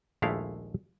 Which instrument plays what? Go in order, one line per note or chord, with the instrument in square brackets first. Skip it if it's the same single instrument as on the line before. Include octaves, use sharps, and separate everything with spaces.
[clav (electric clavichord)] A#1 D#2 G#3 A3 E4 F5